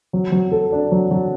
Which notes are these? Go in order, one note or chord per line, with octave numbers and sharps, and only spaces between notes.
F#3
F#3
A4
D4
F#3
F#3